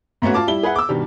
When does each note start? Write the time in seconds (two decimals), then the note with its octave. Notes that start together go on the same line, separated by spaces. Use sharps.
0.22 G#2 A3 B3 C#4 F#4
0.34 F4 A5 D6
0.47 G3 E4 G7
0.63 G#4 B4 E5 F#5
0.76 D6 E6
0.89 G2 B2 D#3 G3